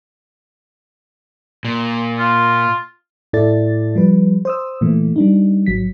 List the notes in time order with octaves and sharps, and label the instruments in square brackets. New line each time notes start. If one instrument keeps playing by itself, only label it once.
[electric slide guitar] A#2
[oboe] F4
[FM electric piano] A2 E4 A4 D5 A6
F3 G3 B4
C5 D#6 E6
A#2 E3 A3
G3 D4 D#4
G#1 F#3 B6